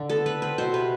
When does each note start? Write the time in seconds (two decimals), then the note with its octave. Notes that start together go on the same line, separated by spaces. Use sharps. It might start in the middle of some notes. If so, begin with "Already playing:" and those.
Already playing: D3
0.10 B3 A4
0.26 B3 B4
0.42 C4 B4
0.58 B2 C5
0.74 C3 B4